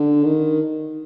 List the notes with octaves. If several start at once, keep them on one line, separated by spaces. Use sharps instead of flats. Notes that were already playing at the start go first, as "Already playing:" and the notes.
Already playing: D3
D#3